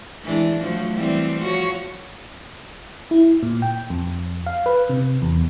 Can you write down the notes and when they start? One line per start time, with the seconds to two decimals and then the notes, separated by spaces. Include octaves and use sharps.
0.24 E3 G#3 D4
0.61 F3 F#3 A3
0.94 E3 G3 C4
1.41 F3 F#4 C#5
3.11 E4
3.43 A#2
3.62 G5
3.90 F2
4.46 F5
4.66 B4
4.90 C3
5.22 E2